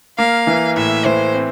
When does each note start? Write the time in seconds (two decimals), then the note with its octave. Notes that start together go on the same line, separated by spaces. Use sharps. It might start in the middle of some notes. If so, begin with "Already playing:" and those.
0.18 A#3 F5
0.47 E3
0.77 A2 E5
1.06 E3 C5
1.34 C4